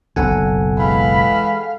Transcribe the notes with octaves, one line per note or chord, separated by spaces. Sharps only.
F#1 B1 B2 A4 F#5 G#5
E3 G#3 F5 B5